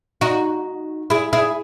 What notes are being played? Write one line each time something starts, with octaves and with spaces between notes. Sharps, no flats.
D#4 F#4
E4 G#4
E4 G#4